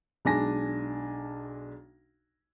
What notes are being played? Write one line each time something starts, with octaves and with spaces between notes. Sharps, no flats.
B1 G#3 D4 G#5 A#6